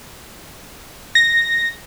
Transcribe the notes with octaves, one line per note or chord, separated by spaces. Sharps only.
A#6